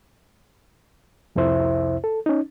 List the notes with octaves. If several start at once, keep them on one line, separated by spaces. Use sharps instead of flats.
C2 F2 C3 E4 C5 E5
A4
C#4 D#4